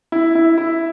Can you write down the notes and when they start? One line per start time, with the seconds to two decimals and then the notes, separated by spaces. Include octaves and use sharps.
0.12 E4
0.35 E4
0.58 E4